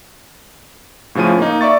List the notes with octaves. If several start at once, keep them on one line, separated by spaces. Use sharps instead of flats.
A2 C#3 F3 C#4 D#7
A#3 D#4
D5 E5 C#6 A6